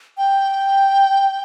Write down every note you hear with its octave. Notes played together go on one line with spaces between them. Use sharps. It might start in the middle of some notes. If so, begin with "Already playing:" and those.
G5